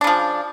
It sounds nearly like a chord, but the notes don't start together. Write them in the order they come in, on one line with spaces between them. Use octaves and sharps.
D4 C#3 F3